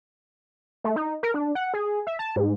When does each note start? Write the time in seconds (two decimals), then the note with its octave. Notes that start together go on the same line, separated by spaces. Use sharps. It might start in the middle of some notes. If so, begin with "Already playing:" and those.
0.84 A3
0.96 D#4
1.23 A#4
1.34 D4
1.55 F#5
1.74 G#4
2.07 E5
2.19 A5
2.36 G#2